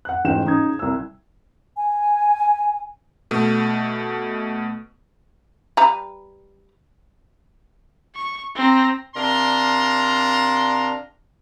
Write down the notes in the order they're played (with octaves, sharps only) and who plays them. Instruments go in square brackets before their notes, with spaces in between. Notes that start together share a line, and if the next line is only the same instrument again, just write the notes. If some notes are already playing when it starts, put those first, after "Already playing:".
[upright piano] F#5 F#6
A1 G#2 F4 G5 E7
C#3 D#4 D#6 G#6
C2 E6
[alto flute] G#5
[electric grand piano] B2 A3
[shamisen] G3 B4 A#5
[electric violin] C#6
C4 A#5
[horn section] C3 D4 A#4 F5 A#5 C6